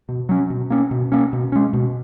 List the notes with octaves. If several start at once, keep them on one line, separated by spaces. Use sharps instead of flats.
B2
F#3 C#4
B2
A#3 C#4
B2
A#3 C#4
B2
G#3 C#4
B2